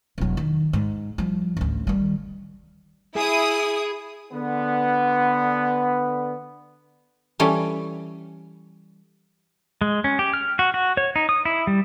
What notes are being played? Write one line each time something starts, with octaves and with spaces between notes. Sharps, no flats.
E1 F#3
D#3
G#2
F3 G3
A1 D2
D#3 G3
E4 G#4 D#6
D3 B3
E3 G3 C#4 A4
G#3
C#4
G4
F6
F#4
F#4
C#5
D#4
D#6
E4
G3